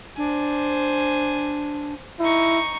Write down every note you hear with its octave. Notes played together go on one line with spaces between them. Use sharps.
D4 C5 G#5
D#4 E4 C#6